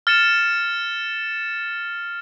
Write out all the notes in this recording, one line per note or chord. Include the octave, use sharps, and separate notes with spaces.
F6 A6 C#7 E7